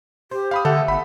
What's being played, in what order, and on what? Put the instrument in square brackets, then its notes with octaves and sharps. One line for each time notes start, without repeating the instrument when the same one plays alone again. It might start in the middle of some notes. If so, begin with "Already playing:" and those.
[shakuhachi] G4 [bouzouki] C5
[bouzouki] B4 [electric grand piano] F5 B5 D#6
[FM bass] D3 [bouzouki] A3 [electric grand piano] A4 F#5
[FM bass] G1 [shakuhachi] F#5 [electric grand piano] B5